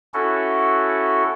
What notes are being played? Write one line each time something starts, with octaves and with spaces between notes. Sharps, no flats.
C#4 E4 F#4 A4